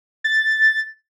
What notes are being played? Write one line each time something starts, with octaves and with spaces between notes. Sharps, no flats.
A6